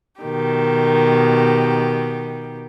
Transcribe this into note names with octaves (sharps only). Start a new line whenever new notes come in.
B2 D#3 G4